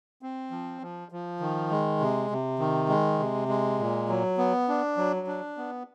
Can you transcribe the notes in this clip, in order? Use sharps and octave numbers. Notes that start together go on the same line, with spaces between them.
C4
F3
F3
F3
D#3
G#3
C3
C3
D#3
G#3
C3
G#3
A#2
F#3
B3
D4
F#3
D4
B3